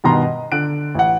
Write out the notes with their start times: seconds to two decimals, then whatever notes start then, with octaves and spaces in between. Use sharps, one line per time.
0.04 G2 B2 D#3 B3 A#5 C6
0.22 D#5
0.52 D3 F#6 D7
0.95 A1 F#5